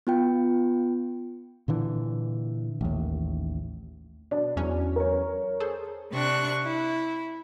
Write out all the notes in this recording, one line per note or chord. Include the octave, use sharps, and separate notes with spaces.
B3 F4 G5
A#2 D3 E3
A1 D#2
B2 D4
E2 F#3 C#4
A#4 C#5
G#4 A4 C5
C3 D4 C#6 F#6
E4